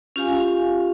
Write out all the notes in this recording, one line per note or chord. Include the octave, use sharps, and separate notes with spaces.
C#4 F4 G4 F5 G#5